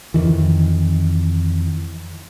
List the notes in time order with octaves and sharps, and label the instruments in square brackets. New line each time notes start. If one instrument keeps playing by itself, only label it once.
[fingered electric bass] F2 D#3 E3